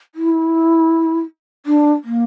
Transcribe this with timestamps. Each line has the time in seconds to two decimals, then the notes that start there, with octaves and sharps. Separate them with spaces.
0.15 E4
1.66 D4
2.04 A#3